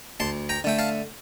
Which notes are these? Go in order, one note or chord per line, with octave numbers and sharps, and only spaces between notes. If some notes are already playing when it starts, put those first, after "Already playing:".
D2 A5 C6
G5 A#5
D3 A3 G5
F5 A5